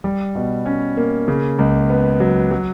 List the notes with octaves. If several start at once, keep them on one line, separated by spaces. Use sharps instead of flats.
G3
B2
C#4
A#3
C#3
C#2
B3
F#3
F#3